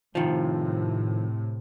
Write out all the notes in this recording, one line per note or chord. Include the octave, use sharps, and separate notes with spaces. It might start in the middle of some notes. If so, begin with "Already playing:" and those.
A2 C3 D#3 F3